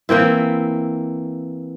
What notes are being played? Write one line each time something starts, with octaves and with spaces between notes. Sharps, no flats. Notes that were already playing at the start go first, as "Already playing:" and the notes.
E3 A#3 C4 E4